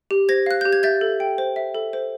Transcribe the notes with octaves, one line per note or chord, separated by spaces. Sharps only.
G4
C5 G#6 A#6
F5 F#6
G4 G6
G#6
E5 G6 A6
A4
G5
C5
E5
A4
C5